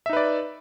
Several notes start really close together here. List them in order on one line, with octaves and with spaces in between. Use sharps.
E5 D#4 B4 D5